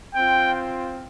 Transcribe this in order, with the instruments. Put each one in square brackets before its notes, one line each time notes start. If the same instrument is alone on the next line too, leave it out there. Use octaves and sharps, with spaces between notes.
[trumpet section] C4 F4 G5